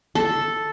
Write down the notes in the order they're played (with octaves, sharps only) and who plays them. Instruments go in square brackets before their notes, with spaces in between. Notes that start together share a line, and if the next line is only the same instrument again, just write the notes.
[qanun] A4